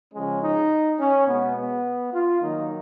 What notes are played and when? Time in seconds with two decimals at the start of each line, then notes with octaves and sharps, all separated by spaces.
0.14 C#3 F3 G#3 C#4
0.43 D#4
0.99 C#4
1.27 B2 G#3 B3
1.57 B3
2.13 F4
2.41 D#3 F#3 A#3 D#4